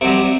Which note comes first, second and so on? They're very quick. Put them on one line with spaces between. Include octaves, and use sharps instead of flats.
C3 F#3 G3